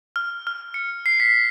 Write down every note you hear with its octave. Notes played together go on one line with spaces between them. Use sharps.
F6
F6
C#7
C7
B6